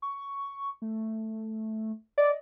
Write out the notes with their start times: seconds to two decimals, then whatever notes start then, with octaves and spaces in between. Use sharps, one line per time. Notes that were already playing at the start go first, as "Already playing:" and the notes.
0.02 C#6
0.82 A3
2.18 D5 D#5